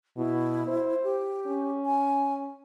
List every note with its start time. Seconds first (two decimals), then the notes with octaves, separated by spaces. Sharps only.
0.17 B2 E4
0.67 C5
1.04 G4
1.47 C#4
1.85 G#5